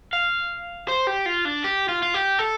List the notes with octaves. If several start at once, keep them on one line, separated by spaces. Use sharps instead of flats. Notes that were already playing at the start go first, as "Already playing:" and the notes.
F5
C5
G4
F4
D4
G4
F4
F4
G4
A4